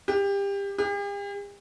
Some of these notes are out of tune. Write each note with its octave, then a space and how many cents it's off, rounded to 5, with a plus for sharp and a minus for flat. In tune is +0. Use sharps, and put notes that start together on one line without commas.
G4 +25
G4 +45